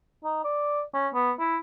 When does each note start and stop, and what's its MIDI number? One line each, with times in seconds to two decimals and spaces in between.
0.24 0.43 63
0.44 0.82 74
0.94 1.08 61
1.14 1.32 59
1.39 1.58 64